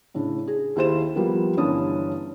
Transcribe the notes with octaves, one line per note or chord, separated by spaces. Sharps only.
A2 C#3 D4
G#4
D#2 E4 G#4 C5 C6 E7
F3 G3 A#3 B3
G1 E3 C#4 D4 D#6